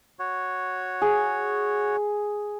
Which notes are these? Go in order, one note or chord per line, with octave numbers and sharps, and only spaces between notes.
F#4 C#5
G#4